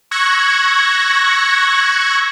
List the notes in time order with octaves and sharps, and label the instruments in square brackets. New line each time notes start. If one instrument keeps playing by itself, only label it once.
[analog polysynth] C#6 E6 F#6 G#6 A#6 C#7